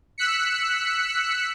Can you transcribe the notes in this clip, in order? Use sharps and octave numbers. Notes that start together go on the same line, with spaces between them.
E6 F#6 B6 C#7